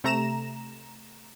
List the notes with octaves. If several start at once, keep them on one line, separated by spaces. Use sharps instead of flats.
C3 A3 A#5 E7